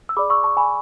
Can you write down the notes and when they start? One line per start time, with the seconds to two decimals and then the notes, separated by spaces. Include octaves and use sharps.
0.09 E6
0.17 G#4 D5 B5 D6
0.30 C#6 E6
0.44 A5 C#6
0.57 G#5 B5